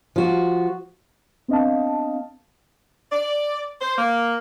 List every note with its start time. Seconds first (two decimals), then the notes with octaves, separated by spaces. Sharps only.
0.16 F3 F#4
1.48 B3 C4 D4 D#5 F5 A5
3.12 D5
3.81 C5
3.98 A#3